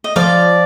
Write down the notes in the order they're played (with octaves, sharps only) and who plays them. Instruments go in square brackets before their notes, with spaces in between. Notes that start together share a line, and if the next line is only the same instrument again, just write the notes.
[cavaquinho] D#5
[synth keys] F3 [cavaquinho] D5 F5